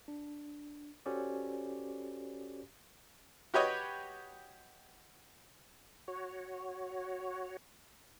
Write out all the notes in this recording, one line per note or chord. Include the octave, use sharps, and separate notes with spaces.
D4
C#4 F#4 G4 A4 C5 D5
F#4 G4 B4 C#5 D#5
F#4 C#5